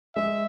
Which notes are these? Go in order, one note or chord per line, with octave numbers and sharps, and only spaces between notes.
G#3 E5